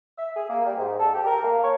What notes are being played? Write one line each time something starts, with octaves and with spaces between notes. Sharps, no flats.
E5
G#4
A#3
G3
G#2
A4
G4
A#4
A#3
C#5